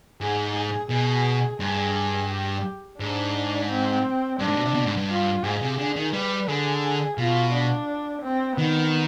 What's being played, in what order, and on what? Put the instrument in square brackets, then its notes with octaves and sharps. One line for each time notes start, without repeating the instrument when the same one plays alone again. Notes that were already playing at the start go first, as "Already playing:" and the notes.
[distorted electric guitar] G#2 [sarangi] G#4
[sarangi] G#4
[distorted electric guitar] B2 [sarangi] G#4
[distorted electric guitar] G2 [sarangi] G#4
[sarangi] G4
[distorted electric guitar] G#2 [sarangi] D4
[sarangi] C4
[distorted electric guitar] G2 [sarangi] D4
[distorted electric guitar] G#2
B2
C3
B2
G#2
G2
[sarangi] F4
[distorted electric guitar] G#2 [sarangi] G#4
[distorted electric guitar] C3
[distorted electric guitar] D3 [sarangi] G#4
[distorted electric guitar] D#3
[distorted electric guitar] G3 [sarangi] B4
[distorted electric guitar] D3 [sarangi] G#4
[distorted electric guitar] B2 [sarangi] F4
[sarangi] D4
C4
[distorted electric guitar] D#3 [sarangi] B3